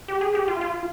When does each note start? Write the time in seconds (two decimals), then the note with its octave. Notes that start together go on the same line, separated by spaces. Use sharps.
0.08 G4
0.21 G#4
0.35 G4
0.48 F4
0.61 F4